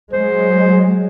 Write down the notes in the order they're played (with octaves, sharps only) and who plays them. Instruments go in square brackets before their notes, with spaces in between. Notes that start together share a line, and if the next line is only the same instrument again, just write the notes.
[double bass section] F#3 G#3 [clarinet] C5